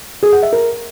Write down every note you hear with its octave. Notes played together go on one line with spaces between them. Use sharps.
G#4
F#5
E5
A#4